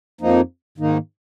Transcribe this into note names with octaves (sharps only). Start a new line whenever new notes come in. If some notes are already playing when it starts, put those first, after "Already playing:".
F2 F3 A#3 D#4
G#2 D#3 A#3 D#4